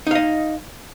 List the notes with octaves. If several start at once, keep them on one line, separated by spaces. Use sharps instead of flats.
D#4 D#5 F5